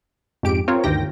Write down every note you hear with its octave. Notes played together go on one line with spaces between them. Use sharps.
F2 G#2 G4 D7
C4 F4 A#4 C#5
D2 G2 D#3 G4 G5 A#6